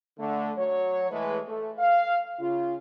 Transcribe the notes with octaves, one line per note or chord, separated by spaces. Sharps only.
D3 A3
F#3 C#5
E3 G#3 A3 B4
A3
F5
C#3 F4